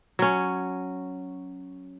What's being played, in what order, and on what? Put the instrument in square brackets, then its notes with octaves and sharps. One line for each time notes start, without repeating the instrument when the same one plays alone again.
[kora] F#3 C#4